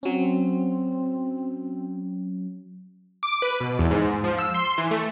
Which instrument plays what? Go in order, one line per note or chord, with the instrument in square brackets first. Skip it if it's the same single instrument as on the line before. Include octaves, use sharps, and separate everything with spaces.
[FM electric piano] F#3 C#4 [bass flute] C4
[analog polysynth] D6
B4
B2
E2
G#2
F3
E6
C6
E3
A3